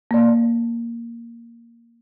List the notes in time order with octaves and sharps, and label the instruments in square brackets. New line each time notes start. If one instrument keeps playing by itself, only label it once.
[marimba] A#3 D5